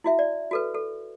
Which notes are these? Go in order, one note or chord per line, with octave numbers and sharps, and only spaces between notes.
E4 F#4 E5
D5
F#4 A4 B4
A4